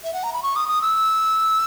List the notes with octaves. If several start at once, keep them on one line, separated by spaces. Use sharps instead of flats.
E5
F#5
A#5
B5
C#6
D#6
D#6
E6